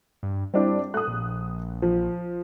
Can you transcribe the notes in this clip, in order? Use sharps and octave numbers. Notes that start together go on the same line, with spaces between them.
G2
G3 C4 D4 E4
A3 D#6 F#6
A#1
F3